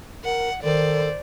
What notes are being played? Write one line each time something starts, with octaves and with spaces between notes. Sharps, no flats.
A#4 F#5
D#3 A4 C5 D5